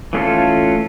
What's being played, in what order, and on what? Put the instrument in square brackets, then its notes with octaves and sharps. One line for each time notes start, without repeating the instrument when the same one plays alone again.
[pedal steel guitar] E3 A3 C#4 F4 A4